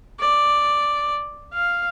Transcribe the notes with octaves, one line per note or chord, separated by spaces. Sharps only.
D5
F5